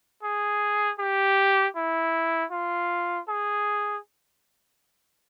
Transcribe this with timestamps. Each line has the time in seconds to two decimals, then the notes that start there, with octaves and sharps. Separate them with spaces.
0.23 G#4
0.99 G4
1.76 E4
2.51 F4
3.29 G#4